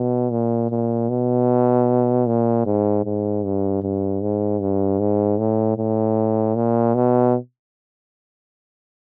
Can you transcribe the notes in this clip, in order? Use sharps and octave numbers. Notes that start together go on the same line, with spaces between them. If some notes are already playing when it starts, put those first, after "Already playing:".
Already playing: B2
A#2
A#2
B2
A#2
G#2
G#2
G2
G2
G#2
G2
G#2
A2
A2
A#2
B2